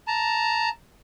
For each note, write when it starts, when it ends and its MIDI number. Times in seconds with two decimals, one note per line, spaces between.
0.07 0.69 81
0.07 0.69 82